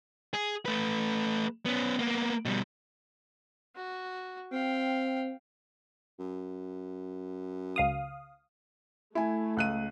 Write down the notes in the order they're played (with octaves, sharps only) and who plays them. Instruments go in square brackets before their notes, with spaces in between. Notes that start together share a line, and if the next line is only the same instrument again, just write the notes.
[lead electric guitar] G#4
A3 B4
B3 C#4
A#3 B3
B2 G3
[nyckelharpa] F#4
[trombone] C4 [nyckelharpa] F5 G5
[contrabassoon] F#2
[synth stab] C#2 F5 D#6
[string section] A3 [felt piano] E4 G#5
[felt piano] C#2 F#6 D#7